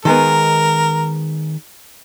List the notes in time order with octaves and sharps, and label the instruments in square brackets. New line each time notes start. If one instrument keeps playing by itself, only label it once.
[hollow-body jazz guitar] D#3 G#3 B3 [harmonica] A#4